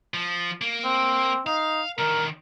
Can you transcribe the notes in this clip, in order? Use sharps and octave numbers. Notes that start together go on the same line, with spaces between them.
F3
A#3
C4
D#4 F5
D3 D#3 A#4